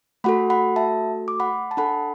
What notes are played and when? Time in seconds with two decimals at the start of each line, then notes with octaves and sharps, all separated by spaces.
0.24 A3 F#4 A4 F#5 B5
0.50 F#5 B5
0.76 E5 A5
1.28 D6
1.40 F#5 B5
1.71 A5
1.77 D4 A4 F#5 B5